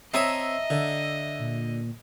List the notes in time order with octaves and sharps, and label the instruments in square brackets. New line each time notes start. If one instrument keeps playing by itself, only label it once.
[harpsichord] C4 C#5 D#6 [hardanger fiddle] D#5 [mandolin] E5 A5 A#5
[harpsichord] D3
[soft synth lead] A#2